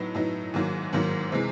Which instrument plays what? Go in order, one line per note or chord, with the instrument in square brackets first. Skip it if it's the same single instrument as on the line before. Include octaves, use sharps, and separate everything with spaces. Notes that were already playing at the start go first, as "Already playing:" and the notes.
Already playing: [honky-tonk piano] A2 F#3 B3 D#4
A2 F#3 B3 D#4
G#2 D#3 F#3 A#3
G#2 D#3 F#3 A#3
C3 E3 G#3